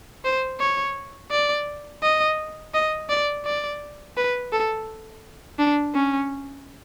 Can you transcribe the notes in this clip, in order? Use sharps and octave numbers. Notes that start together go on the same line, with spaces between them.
C5
C#5
D5
D#5
D#5
D5
D5
B4
A4
D4
C#4